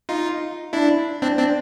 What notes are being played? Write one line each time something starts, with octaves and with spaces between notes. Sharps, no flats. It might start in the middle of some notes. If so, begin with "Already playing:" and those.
D#4 F4
D4 E4
C4 D4
C4 D4